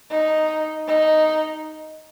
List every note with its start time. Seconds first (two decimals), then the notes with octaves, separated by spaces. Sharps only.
0.10 D#4
0.88 D#4